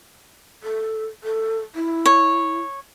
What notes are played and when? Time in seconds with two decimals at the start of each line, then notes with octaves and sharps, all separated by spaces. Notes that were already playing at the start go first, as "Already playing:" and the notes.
0.63 A4
1.23 A4
1.75 E4
2.06 C#5